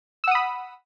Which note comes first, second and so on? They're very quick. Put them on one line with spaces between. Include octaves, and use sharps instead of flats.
E6 F#5 D#6 B5